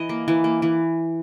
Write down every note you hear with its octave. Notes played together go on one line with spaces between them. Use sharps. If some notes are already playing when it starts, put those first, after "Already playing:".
Already playing: E3 D#5
A#3
E3
A#3
E3